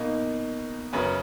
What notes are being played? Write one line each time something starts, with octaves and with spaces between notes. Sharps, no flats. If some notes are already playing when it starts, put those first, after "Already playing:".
Already playing: B2 A#3 D#4
F#2 C#3 F#3 C#4 B4